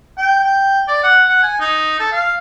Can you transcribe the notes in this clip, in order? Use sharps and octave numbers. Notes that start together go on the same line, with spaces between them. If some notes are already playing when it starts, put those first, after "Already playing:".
G5
G5
D5
F#5
F#5
G#5
D#4
A4
F5